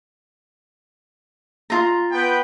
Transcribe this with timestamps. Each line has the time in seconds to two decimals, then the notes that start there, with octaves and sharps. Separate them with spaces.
1.70 F4 A#5
2.12 B3 B4 G5